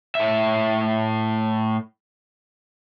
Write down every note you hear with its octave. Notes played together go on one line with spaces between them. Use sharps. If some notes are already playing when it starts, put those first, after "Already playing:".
A2 E5